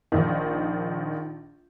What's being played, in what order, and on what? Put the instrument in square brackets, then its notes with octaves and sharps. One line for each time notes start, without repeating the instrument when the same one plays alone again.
[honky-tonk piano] A#1 D#3